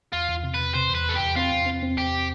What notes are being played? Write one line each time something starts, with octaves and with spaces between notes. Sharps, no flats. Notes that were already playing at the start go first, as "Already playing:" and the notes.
E2 F4
E2
C3
B4
C3
C3 C5
E2 B4
E2 A4
E2 G4
C4 F4
E2
C4
C4
E2 G4